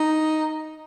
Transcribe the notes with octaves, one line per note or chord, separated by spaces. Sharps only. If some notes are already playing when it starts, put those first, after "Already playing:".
Already playing: D#4